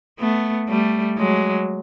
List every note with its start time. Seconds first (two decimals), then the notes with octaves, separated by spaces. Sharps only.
0.19 A3 B3
0.69 G3 A3
1.18 F#3 G#3